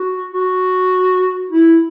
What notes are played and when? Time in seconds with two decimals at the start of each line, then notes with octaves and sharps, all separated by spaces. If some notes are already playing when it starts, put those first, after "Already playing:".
Already playing: F#4
0.31 F#4
1.50 E4